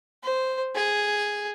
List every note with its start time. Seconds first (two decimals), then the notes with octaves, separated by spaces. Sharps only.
0.24 C5
0.75 G#4